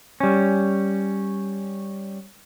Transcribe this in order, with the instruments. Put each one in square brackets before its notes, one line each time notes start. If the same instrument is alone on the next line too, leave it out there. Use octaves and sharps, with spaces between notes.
[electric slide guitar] G3 C#4